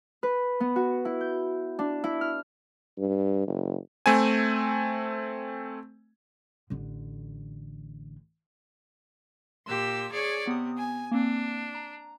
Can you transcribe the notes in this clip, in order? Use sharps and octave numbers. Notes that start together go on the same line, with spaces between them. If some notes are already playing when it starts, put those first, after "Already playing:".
B4
B3
F#4
E4
G6
D4
E4
F6
G2
F#1
A3 C4 G#5
A1 D3
A#2 G4 C6 E6
G#4 C#5 D5
C3 B3 D#6
G#5
A#3 C4 D4
A#5